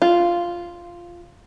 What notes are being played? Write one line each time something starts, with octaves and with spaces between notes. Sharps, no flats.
F4